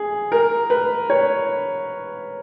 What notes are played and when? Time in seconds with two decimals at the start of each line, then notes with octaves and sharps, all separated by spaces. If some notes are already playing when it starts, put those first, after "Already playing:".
Already playing: G#4
0.32 A#4
0.70 B4
1.10 C#5